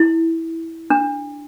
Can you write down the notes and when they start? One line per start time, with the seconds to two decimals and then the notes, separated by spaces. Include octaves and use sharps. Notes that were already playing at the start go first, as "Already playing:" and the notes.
Already playing: E4
0.90 D4